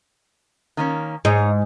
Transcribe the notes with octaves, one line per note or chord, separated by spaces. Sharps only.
D#3 A#3 C#4
G#2 D#4 C#5 D#5